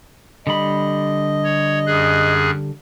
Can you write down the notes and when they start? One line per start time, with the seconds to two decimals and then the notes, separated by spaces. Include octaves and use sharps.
0.47 D3 G3 D#5 B5
1.44 C#5
1.86 F#2 G#4 F#6